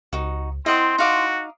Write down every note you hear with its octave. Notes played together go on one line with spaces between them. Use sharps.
C#2 D#4 F#4
C4 E4 D#5 F#5 C6 D#6
D#4 F#4 F5 D6